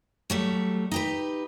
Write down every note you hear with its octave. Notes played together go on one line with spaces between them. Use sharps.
F#3 G3 A3
D#4 G4 B4